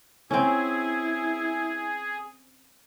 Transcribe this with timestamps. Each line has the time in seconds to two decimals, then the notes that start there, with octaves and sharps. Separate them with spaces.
0.31 C4 C#4 E4 G#4